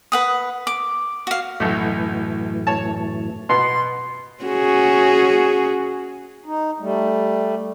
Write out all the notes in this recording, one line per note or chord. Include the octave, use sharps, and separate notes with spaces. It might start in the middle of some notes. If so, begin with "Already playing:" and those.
B4 F#5 D#6
D6
F#4 F5
B1 F#2 A2 E3 A3
C#5 A5
B2 B3 C6
C#4 F#4 G#4
D#4
G3 A3